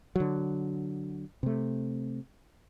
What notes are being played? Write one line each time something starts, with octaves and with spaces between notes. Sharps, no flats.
D3 F#3
C3 A3